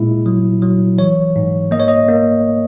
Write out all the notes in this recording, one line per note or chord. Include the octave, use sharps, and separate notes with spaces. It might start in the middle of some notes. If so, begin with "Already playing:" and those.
Already playing: A#2 G#3 E4
F#3
F#3
E3 C#5
G#2
A#3 D#5
C#5
D#5
A#3